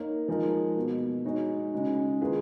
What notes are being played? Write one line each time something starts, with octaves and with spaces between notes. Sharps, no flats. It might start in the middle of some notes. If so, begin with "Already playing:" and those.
Already playing: A#3 D#4 A#4 C#5
F3 G#3 D#4 A#4
B2 F#3 A#3
G#3 D#4 F#4 C#5
C#3 G#3 D#4 F#4
D#3 A#3 F4 G#4 B4